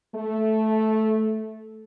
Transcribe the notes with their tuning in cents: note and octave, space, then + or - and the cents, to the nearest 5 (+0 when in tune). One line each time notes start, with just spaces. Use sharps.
A3 -10